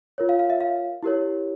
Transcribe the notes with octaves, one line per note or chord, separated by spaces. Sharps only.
F4 A#4 C#5
F5
F5
E5
F5
E4 G4 A#4 C#5